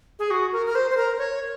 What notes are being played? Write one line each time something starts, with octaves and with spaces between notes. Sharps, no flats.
G#4
F#4
A#4
A#4
C5
C5
A#4
C#5